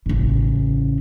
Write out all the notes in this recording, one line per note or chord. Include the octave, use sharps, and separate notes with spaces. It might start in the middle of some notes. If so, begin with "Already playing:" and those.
A1 C#3